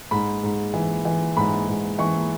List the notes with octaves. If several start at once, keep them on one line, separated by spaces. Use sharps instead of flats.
G#2 B5
G#2
E3
E3
G#2 B5
G#2
E3 C#6